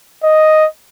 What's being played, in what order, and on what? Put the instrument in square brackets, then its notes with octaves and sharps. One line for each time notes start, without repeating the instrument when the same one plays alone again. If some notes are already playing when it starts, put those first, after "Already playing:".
[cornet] D#5